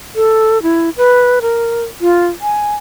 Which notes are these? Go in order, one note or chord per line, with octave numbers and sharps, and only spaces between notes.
A4
E4
B4
A#4
F4
G#5